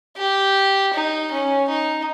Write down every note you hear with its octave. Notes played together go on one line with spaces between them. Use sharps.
G4
D#4
C#4
D#4